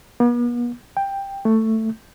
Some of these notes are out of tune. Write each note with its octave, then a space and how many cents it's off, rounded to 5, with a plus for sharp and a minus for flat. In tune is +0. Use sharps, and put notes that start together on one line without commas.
B3 -45
G5 +10
A3 +10